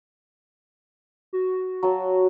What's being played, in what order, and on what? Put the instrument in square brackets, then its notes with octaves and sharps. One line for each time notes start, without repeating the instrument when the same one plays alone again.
[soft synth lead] F#4
[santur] F#3 A5